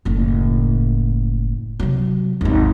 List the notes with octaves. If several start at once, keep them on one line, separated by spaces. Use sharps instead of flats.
F#1 A2
C3 F#3
G#1 D#2